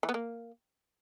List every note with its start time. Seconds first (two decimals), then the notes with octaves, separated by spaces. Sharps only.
0.03 E3
0.09 B3
0.14 A#3